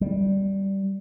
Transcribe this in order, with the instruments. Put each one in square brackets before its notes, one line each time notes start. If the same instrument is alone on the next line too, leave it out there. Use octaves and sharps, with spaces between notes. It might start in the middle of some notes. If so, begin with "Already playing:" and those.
[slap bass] G3